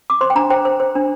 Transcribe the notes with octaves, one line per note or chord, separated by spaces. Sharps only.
D6
C5 C6
G5
D4 A#5
C5 G5
C5
C5
D4